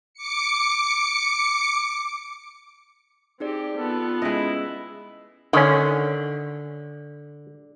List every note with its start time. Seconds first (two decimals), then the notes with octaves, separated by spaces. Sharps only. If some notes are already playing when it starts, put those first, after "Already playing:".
0.14 D6 C#7
3.40 C4 D#4 G4 G#4 D5
3.77 B3 F4 A4
4.22 G#3 C#4 E4 D#5
5.53 D3 D#3 C#4